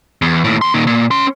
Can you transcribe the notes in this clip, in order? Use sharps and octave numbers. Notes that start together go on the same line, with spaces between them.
E2
D#2 A2
E2 C6
A#2 D#3
A#2
C#4 C6